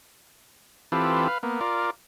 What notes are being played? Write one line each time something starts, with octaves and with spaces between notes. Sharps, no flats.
E3 C4 F4 G4 A4 B4
B4 F5
A#3 B3
F4 A#4 D5